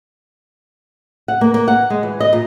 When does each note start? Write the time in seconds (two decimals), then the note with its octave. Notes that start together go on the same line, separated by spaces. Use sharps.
1.28 F#5
1.41 A#3
1.54 A#3
1.68 F#5
1.90 G#3
2.03 E3
2.20 D#5
2.33 A#2